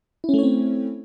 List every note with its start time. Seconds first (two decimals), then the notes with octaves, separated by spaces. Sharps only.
0.24 E4
0.29 C#4
0.34 A3
0.38 C#5
0.43 C4